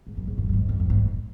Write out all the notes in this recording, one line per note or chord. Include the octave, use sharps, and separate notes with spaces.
G#2
F#2
G#2
F#2
F#2
G#2
F2
F2
G#2